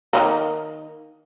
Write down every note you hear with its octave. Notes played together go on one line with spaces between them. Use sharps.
D#3 E3 A#3